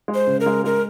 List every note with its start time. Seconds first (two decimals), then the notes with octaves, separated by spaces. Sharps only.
0.08 G#3
0.14 C5
0.27 C#3
0.40 A#4
0.46 G#3
0.64 G#3 A#4